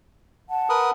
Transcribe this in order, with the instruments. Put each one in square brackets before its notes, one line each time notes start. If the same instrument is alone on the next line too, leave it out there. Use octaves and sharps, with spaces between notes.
[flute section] F#5 A5
[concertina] A#4 B4 D#6